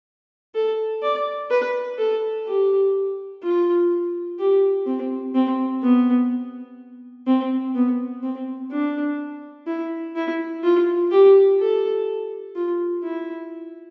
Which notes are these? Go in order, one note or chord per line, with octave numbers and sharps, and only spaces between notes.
A4
D5
B4
A4
G4
F4
G4
C4
C4
B3
C4
B3
C4
D4
E4
E4
F4
G4
A4
F4
E4